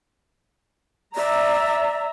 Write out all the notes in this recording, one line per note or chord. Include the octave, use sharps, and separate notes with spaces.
D5 E5 A#5